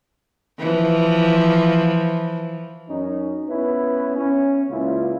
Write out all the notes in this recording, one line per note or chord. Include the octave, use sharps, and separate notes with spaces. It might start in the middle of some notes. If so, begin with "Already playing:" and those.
E3 F3
F#2 C#4 D#4
B3 C#4 E4 B4
C#4
C#2 A#2 E4 F4